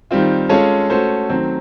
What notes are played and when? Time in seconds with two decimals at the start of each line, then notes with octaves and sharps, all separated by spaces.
0.11 D#3 G3 C4 F4
0.49 G#3 C#4 F4 A4 C#5
0.90 A3 C#4 F#4 A4 C5
1.29 D#3 F#3 A3 C4